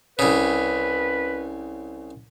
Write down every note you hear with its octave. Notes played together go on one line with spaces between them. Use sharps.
C2 C#3 B4